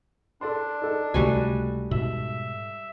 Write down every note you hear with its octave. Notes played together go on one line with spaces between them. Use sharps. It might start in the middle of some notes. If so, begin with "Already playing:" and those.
D4 A4 D5 C6
D#4 A4 A5
C#2 C3 G3 A3 F#4 G#5
G#2 B2 E5